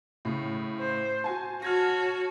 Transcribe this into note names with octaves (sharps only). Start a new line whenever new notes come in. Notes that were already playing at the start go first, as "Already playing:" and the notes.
A2 C#3
C5
F#4 G#5 A5
F#4 C#5 A5 F6 G#6 A#6